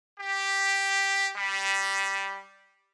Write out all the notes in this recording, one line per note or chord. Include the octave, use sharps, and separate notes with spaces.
G4
G3